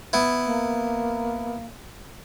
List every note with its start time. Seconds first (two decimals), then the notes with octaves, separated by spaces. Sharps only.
0.13 B3 E4
0.46 A#3